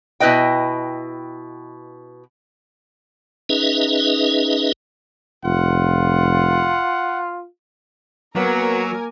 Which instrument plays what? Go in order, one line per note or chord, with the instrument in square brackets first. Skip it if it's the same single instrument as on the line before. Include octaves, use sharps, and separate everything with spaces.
[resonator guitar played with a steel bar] B2 E4 B4 D#5 G5
[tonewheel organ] C#4 D#4 G#4 B4 D#5 E5
[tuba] F1 [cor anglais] F4 [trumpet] F#5
[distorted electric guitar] F#3 [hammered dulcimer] A#3 [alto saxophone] B3 [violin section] A#4 G#5